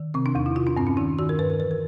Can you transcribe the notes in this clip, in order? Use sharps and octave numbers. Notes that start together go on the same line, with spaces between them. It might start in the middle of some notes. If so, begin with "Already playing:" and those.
Already playing: D#3
C3 C4
D4
E2 D#4
E4
C3 F4
D4
G2 C4
C#4
D#3 D#4
D#3 F#4
A#4
G2 B4
A#4
E3 B4
A#4